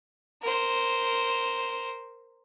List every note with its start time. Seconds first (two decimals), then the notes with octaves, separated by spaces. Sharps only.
0.42 A#4 C5